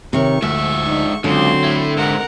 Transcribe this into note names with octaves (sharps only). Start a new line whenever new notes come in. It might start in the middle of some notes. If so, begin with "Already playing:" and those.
F2 C3 D#3 F3 C#5 C#6
D2 G#2 F3 E5
F3 D4 D#4
C#2 D3 F#3 C4 C6
A3 E4
G#2 C3 A#4 F#5